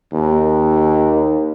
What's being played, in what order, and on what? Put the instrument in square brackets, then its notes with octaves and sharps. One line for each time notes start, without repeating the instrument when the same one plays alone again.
[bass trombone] D#2